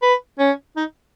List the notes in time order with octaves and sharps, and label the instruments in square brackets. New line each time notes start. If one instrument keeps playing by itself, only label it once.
[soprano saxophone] B4
C#4
D#4